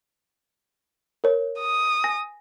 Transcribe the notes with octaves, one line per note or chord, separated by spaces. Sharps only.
A#4 C#5
D#6
G#5 A#6